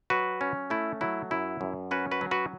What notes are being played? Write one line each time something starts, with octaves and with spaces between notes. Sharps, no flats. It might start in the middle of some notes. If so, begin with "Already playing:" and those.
F#3 F#4 B4
C#4
A3 E4
F#3 E4
F#2 E4
F#2
C#4 F#4 B4
F#4 B4
F#3
F#4 B4